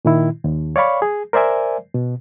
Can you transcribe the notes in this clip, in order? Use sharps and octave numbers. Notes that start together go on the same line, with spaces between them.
A#2 D#3 E4
D#2
C#5 D5 F5 B5 C#6
G#4
A#4 C5 D5 E5 G#5
B2